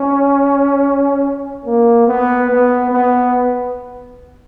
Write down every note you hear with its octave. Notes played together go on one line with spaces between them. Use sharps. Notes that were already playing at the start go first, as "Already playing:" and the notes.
Already playing: C#4
A#3
B3
B3
B3